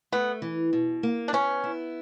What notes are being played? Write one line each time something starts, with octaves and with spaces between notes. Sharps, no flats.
A3 B3
E3
B2
A#3
D4
B3 C#4
E4